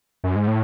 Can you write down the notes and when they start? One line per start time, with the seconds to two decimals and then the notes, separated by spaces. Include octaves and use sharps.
0.24 F#2
0.36 G#2
0.47 A2